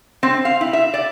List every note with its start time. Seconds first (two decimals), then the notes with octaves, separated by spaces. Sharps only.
0.23 C4
0.45 F5
0.61 E4
0.73 E5
0.94 D5